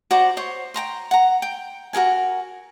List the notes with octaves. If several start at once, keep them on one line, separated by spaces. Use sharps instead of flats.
F#4 C5 D5 A#5
C5 C#5
G5 A5 A#5 C6
F#5 A#5
G5
F#4 A4 A#4 G#5